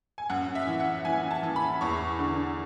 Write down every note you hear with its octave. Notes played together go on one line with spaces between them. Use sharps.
G#5
F#2 F#5
E5
E3
F#5
E3 G#5
A5
E3
B5
E2 C#6
D3